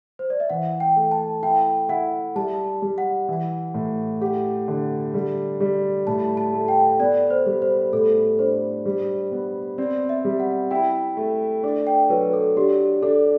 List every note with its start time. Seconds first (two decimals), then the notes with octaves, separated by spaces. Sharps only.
0.19 C5
0.30 D5
0.40 E5
0.50 E3 F#5
0.80 G5
0.96 A3
1.11 A5
1.43 E4 G5
1.89 E4 F#5
2.35 G3 A5
2.82 G3
2.98 F#5
3.28 E3
3.74 A2
4.21 G4 F#5
4.68 D3
5.14 G3
5.60 G3
6.07 A2 A5
6.37 A5
6.53 A3
6.68 G5
7.00 B3 D5
7.30 C5
7.46 G3
7.62 C5
7.92 A2 A4
8.39 D4 C5
8.85 G3
9.32 B3
9.78 C4 D5
10.09 E5
10.25 G3
10.40 F#5
10.71 E4 G5
11.17 A3
11.63 D4
11.87 G5
12.10 F#3 B4
12.33 A4
12.56 D4 G4
13.03 D4 A4